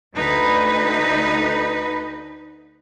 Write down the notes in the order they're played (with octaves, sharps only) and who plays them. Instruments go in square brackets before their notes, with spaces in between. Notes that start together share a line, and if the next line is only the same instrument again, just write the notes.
[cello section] D2 D3 D#4 B4